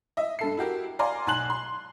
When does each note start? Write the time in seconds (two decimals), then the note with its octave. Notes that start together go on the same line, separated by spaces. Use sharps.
0.17 D#5 E5
0.39 G2 A4 C7
0.57 E4 F#4 G4 A#4
0.99 D5 F5 G#5 A#5 C6
1.27 B1 G#5 A5 C6 F#6 F#7
1.50 C6